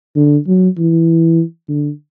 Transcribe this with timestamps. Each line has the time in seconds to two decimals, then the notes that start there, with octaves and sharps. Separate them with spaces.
0.16 D3
0.47 F#3
0.77 E3
1.69 D3